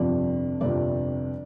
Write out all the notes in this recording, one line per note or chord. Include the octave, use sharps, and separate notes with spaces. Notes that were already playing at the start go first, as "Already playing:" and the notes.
Already playing: G1 F2 C3 F3 D5
G1 F2 C3 F3 D5